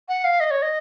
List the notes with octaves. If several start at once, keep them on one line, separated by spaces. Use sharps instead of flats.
F#5
F5
D#5
C#5
D#5